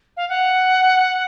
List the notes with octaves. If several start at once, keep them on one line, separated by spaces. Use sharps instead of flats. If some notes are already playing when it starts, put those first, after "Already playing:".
F5
F#5